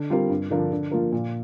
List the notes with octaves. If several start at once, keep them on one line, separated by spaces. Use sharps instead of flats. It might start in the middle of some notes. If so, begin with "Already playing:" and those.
Already playing: D3
G3 C4 F4 A#4
G2
D3 F3 D4 A#4
D3
F3 A#3 F4 A#4
A#2